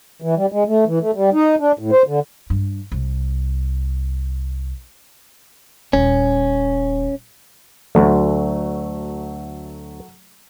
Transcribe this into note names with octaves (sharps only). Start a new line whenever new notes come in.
E3
G3
G#3
A3
E3
A3
G3
D#4
D4
A2
C5
D3
G2
C2
D#1 C#4
D2 F#3 A3